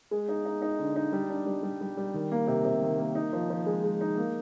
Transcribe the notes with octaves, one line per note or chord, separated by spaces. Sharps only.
G#3
D#4
D#4
D#4
D3
D#4
G3
D4
G3
G3
G3
G3
D#3
A#3
C3
C3
D#3
A#3
D#4
F3
F3
G#3
G#3
D#4
A#3